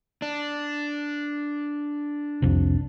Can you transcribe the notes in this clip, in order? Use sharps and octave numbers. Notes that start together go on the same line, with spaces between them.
D4
C2 F2 C3